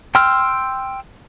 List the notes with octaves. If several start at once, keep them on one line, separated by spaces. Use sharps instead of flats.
G5 C6 E6 F6